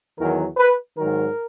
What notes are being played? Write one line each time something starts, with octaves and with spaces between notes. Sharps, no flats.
E2 D#3 F#3 A#4
B4
G#2 D#3 F#3 A#4